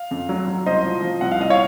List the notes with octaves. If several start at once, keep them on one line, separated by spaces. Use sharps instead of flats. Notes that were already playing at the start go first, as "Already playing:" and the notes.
Already playing: F5
F2
F#3
F#3
C2 C5 D#5
F3
F3
C2 F#5
F5
C2 D#5
C#5 F5